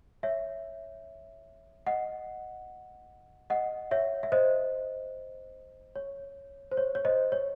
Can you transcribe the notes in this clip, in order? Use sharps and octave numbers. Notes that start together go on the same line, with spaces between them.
C#5 E5
D#5 F#5
D#5 F#5
C#5 E5
E5
C5 D#5
C#5
C5
C#5
C#5
C5 D#5
C#5